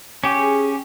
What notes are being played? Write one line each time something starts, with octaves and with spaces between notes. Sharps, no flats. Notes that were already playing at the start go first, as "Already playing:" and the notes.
C#4 G4
G#4